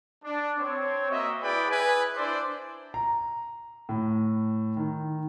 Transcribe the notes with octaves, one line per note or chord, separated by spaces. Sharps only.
D4
C4 C#5
A#3 F#4 D#5 E5
E4 G#4 B4 D5 G5 B5
G#4 B4 E5 G#5
D4 E4 C5 D5
A#5
A2
D#3